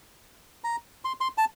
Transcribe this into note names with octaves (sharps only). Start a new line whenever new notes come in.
A#5
C6
C6
A5